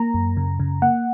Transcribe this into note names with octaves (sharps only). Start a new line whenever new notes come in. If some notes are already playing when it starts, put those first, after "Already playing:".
Already playing: A#3 A#5
F#2
C#3
C#3
A#3 F#5